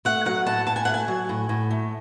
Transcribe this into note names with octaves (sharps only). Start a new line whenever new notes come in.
A3 F#5
F#3 F#5
A2 A5
A2 A5
G#5
A3 F#5
G#5
F#3
A2
A2
A3